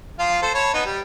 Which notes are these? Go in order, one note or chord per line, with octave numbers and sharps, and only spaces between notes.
F3 F4 F5
A4 C5
C#5 A5 B5
B3 D#4
G3 G4